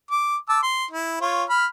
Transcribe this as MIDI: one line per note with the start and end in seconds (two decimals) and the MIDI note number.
0.11 0.36 86
0.49 0.60 81
0.49 0.60 86
0.49 0.60 88
0.63 0.85 84
0.91 1.18 64
1.21 1.44 65
1.21 1.44 73
1.50 1.66 83
1.50 1.66 89